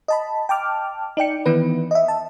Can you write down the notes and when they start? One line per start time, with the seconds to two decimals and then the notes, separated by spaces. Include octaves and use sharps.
0.08 D#5 A5 B5
0.49 G5 A5 D6 F6
1.17 D#4 D5 G5 C#7
1.46 D#3 E3 B3 E4 B4
1.91 D#5 E5
2.08 A5